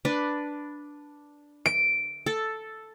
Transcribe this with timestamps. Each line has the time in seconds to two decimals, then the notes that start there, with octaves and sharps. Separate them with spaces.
0.05 D4 B4
1.66 D7
2.26 A4